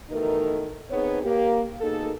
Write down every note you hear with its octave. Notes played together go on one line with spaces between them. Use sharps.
B2 D#3 E3 A3 D#4 A#4
B3 C4 D#4 G#4 C#5
A#3 G4
B2 A#3 D#4 G#4 A4